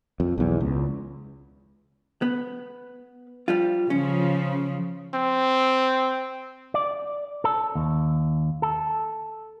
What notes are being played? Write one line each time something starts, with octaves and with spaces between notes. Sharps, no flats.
F2
B1 E2
C#2
B3
F3 G3 F4
C#3 F3 C#4
C4
D5
A4
D#2
A4